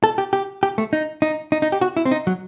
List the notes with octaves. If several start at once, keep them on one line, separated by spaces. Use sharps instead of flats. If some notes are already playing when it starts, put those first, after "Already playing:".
A4
G4
G4
G4
A3
D#4
D#4
D#4
D#4
G4
F#4
E4
C4
D#4
F#3